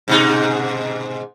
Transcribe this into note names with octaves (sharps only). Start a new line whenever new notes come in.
G#2 B2 D#4